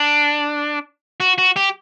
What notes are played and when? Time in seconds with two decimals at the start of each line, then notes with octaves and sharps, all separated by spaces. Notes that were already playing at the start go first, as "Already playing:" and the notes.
Already playing: D4
1.20 F#4
1.38 F#4
1.56 G4